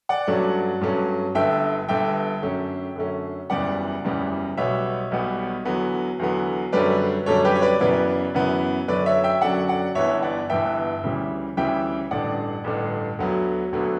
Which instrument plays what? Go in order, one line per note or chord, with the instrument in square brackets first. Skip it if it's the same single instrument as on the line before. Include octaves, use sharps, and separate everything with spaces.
[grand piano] D5 F#5
G2 F#3 A3 C#4
G2 F#3 A3 C#4
G1 G2 D3 E5 G5
G1 G2 D3 E5 G5
F#2 D3 A3 C#4
F#2 D3 A3 C#4
F#1 E2 C#3 G3 B3 D5 F#5
F#1 E2 C#3 G3 B3
B1 B2 G3 B3 C#5 E5
B1 B2 G3 B3
E2 D3 F#3 B3
E2 D3 F#3 B3
F#2 D3 G3 C#4 B4 D5
F#2 D3 G3 C#4 A4 C#5
G4 B4
C#5
B4 D5
F#2 C#3 E3 B3 B4 D5
F#2 C#3 E3 B3
F#2 D3 F#3 C#4 B4 D5
C#5 E5
E5 G5
F#2 D3 F#3 C#4 D5 F#5
D5 F#5
G1 G2 E3 B3 C#5 E5
D5 F#5
G1 G2 E3 B3 E5 G5
D2 C#3 E3 G3
D2 C#3 E3 G3 E5 G5
A1 G2 D3 D5 F#5
A1 G2 D3
D2 D3 F#3 B3
D2 D3 F#3 B3